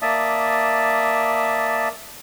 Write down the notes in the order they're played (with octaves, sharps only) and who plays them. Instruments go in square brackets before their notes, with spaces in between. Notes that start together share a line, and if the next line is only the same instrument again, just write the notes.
[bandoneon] A#3 D5 E5 A5 D#6